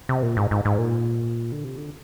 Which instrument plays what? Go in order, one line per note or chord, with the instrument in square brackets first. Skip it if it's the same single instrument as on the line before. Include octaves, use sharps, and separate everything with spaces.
[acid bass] C3
A#2
G#2
G#2
G#2
A#2
D3
C3
D3